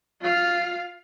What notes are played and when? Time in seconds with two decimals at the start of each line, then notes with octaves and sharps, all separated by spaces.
0.21 F4 F5